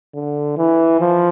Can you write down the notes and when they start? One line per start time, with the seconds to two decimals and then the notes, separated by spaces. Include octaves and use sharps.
0.15 D3
0.58 E3
1.00 F3